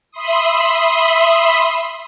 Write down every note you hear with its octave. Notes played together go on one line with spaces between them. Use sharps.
E5 B5 C6 D#6